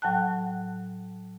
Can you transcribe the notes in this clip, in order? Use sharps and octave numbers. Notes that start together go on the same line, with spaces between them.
A2 F#3 F#5 G5 A5 F#6